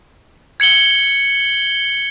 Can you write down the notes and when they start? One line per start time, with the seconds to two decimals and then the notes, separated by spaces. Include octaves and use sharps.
0.60 G#6 C#7 F#7 G7